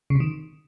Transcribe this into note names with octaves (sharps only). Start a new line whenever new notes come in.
C#3
C3
D#3